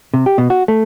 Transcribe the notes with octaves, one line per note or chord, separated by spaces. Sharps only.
C3
G4
B2
F#4
A3